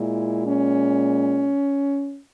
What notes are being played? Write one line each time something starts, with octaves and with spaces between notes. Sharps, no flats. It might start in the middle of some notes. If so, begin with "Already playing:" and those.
Already playing: A#2 G#3 E4
C#4